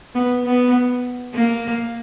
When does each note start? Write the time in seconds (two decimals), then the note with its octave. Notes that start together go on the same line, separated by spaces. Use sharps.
0.15 B3
0.44 B3
1.34 A#3